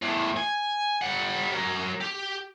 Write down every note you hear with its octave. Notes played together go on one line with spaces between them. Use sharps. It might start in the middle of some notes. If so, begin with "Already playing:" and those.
E2 A2
G#5
G3 F#5
F#3 A#4
G4